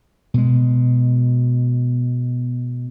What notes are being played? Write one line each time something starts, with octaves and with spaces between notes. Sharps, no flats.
B2 G#3